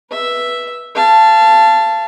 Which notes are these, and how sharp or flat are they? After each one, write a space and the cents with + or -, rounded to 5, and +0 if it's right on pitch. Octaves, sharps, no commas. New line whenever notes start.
B4 -15 E5 +0
F5 -35 A5 +0